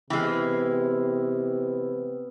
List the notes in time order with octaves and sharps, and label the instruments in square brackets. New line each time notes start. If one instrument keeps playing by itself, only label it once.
[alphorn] C3 [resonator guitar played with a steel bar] E3 G#3 [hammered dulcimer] B3 [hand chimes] G5 E6 F6